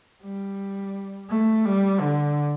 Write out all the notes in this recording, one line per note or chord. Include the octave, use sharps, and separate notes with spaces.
G3
A3
G3
D3